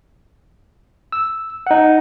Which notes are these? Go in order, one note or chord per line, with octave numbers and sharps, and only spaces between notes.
E6
D#4 F#5